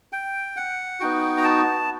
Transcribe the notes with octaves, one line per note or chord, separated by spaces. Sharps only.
G5
F#5
B3 D#4 F#4 G5
A#5
A5